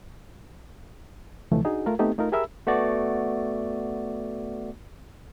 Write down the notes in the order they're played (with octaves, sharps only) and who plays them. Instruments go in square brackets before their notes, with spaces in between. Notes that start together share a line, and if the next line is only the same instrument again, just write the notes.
[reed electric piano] D2 C3 E3 F3 A3
D4 D#4 F#4 G#4
A3 F4 A#4
A3 B3 C4 D#4 G4 A4
A3 D#4 F4 A#4
G4 G#4 A#4 E5 B5 E6
[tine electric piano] A3 B3 F#4 D5